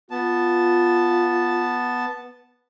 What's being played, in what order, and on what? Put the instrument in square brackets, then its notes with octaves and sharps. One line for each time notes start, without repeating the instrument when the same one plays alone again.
[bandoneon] B3 A5 [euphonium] F4